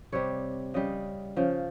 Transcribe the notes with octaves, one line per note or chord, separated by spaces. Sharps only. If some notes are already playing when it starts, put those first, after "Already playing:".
C3 G3 C#5
C#3 G3 D#5
C#3 F3